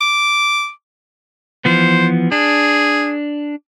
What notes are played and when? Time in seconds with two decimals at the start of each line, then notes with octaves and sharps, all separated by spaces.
0.01 D6
1.65 E3 F3 B3 C5
2.32 D4 G#4